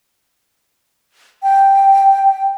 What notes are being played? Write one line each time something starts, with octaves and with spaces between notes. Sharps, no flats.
G5